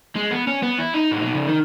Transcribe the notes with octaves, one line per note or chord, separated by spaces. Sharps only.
G#3
B3
C#4
B3
E4
D#4
A2
B2
C#3
D#3